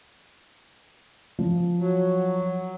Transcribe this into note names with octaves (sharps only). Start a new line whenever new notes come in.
F3
F#3